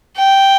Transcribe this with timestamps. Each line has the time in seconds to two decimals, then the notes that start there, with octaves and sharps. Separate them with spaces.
0.17 G5